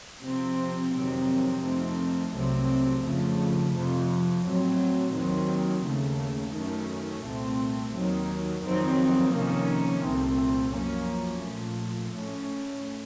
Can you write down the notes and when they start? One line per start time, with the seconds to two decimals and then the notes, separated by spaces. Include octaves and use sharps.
0.23 C3 F3 C4
0.94 F2 C3 D#3 F#3 C4
1.63 F2 D#3 A3 C4
2.33 C2 C3 F#3 A3 C4
3.03 F2 C#3 F3 A3
3.74 F2 C3 F3
4.44 A2 F#3 C4
5.14 D#2 D#3 F#3 C4
5.84 D#2 C#3 A3
6.53 F#2 D#3 A3 C#4
7.24 C2 A#2 A3 C4
7.94 D#2 D#3 F#3
8.64 F2 D#3 F#3 C4
9.34 F2 C3 D#3 A#3 C#4
10.04 C2 A#2 A3 C4
10.74 F#2 F3 A#3 C#4
11.44 A#2 F3 A3
12.14 A2 A3 C#4